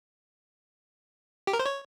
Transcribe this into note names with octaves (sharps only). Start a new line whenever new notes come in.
G4
A#4
C5
C#5